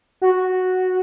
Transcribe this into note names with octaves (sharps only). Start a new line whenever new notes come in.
F#4